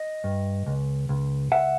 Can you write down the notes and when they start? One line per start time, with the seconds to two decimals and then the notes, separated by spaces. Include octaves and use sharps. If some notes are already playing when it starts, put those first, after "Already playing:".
Already playing: D#5
0.24 G2
0.66 C#2
1.09 C#2
1.52 C#2 E5 F#5